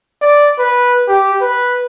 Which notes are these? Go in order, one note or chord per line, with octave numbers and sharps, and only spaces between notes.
D5
B4
G4
B4